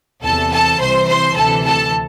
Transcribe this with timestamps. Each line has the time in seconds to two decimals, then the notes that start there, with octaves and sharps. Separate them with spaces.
0.22 E2 C3 E3 A4 A5
0.51 A4 A5
0.80 C2 C3 E3 C5 C6
1.07 C5 C6
1.35 D2 C3 E3 A4 A5
1.64 A4 A5